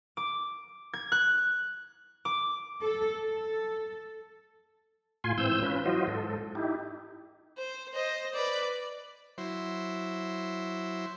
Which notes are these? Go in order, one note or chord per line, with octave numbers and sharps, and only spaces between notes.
D6
G#6
F#6
D6
A4
A4
A2 F4 G#5 C6
G#2 E3 C4 E6 G6
C#4 F4 B4
E3 F#3 F4 F#4 C5 D#5
G#2 A4
D#4 E4 G4
C5
C5 D#5
B4 D5
F#3 E4 C5